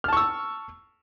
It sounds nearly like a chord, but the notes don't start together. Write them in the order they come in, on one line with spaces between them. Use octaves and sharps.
F6 A5 C#6 E6